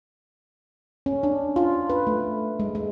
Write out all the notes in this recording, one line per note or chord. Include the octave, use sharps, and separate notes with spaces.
C#4
D4
F4
B4
A3
G#3
G#3